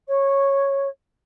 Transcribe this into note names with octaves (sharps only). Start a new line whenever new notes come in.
C#5